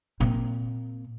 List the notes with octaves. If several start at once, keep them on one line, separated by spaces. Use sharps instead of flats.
A#2 C4